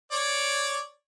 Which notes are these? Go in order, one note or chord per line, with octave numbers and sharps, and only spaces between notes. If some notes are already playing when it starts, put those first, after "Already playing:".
C#5 D5